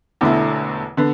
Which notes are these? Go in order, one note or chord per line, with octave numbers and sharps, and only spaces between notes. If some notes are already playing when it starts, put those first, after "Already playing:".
E1 E2 D3 A3 E4
D3 B3